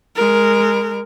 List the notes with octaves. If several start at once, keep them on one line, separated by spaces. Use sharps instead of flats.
G#3 A#4